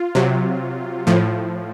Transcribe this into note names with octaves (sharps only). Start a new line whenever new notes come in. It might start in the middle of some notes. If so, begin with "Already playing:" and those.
Already playing: F4
C3 F#3
A2 F3